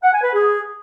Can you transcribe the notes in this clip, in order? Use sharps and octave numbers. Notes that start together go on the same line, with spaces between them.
F#5
G#5
B4
G#4